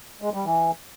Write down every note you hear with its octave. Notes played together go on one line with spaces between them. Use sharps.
G#3
G3
E3